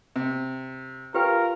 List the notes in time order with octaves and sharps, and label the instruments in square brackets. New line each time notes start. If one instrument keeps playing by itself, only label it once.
[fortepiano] C3
[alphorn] F4 [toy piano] G4 B4 G5 [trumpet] A#4